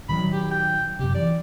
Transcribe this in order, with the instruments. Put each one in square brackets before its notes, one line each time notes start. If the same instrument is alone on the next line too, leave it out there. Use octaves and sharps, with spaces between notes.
[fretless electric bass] A#2 D#3 F#3 [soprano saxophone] B5
[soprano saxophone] G4
G5
[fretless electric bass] F#2 C3 [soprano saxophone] G4
[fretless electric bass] E3 [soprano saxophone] D5